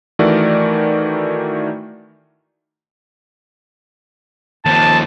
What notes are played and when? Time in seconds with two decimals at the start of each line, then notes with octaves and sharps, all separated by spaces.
0.19 D#3 E3 A3 F#4 A#4 D5
4.66 D#2 F3 A5